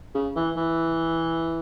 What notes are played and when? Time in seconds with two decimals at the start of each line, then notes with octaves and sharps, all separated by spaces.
0.14 C#3
0.36 E3
0.56 E3